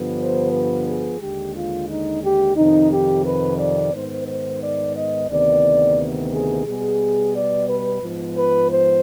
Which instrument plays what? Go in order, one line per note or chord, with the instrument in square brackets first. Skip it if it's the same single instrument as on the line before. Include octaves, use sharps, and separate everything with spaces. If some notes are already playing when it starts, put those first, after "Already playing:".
Already playing: [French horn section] G2 D3 F3 B3
C5
B4
G#4
D#2 D3 G#3 G4
F4
D#4
G4
F2 C3 D#3 D#4
G4
B4
D5
G#2 D#3 B3 C5
C5
D5
D#5
D2 C3 D#3 B3 D5
G#4
B2 G3 B3 G#4
D5
B4
G#2 F3 B3
B4
C5